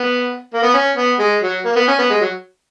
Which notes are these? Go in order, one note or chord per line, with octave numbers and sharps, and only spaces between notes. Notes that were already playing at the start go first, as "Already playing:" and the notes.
Already playing: B3
A#3
B3
C#4
B3
G#3
F#3
A#3
B3
C#4
B3
G#3
F#3